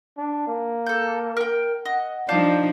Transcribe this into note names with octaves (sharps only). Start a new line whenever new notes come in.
D4
A#3
A4 G6
A#4 G5
D#5 F#5
F3 D4 D#4 D5 F5 A5 G6